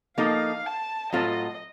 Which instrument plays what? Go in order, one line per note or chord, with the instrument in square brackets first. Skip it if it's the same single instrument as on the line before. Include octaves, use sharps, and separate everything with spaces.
[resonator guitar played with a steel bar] F3 A#3 D#4 A4 [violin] F5
[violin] A5
[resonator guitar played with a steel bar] A2 F#3 C4 F4 A4 [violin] D#5